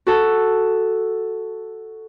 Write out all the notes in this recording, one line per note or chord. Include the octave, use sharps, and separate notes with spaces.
F#4 A4